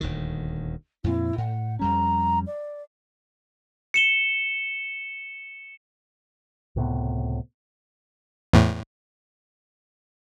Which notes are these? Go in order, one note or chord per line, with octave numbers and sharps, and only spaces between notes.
D#1 D2 D#3
F2 A#2 C4 E4
A2 F#5
F2 G3 C#4 A#5
D5
C#7 E7 G7
C#2 A2 C3 B3
E2 A2